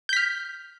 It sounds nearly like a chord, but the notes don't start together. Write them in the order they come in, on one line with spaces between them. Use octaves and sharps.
G6 B6 F6